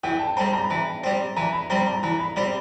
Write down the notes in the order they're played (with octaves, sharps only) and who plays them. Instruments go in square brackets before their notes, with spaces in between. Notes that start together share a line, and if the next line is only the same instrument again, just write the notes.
[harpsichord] E3 [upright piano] G5
[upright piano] A5
[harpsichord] G3 C4 [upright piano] A#5
[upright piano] A#5
B5
[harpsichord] E3 [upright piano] A#5
[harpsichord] G3 C4
[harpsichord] E3 [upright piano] A#5
[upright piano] B5
[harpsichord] G3 C4 [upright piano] A#5
[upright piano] A#5
[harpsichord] E3 [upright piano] A#5
[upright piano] B5
[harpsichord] G3 C4 [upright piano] B5